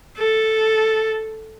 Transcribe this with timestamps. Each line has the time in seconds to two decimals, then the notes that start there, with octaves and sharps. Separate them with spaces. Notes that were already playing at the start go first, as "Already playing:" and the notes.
0.18 A4